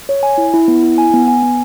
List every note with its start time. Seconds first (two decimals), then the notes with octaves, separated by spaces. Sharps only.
0.09 C#5
0.23 G#5
0.38 E4
0.54 E4
0.68 B3
0.83 E4
0.98 G#5
1.14 B3
1.28 G#5
1.43 B3